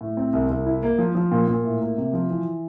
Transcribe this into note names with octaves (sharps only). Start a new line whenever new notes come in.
A2
C4
C2
C2
E4
A#3
F3
F3
A#2
A#2
A2
A#3
C3
F3
E3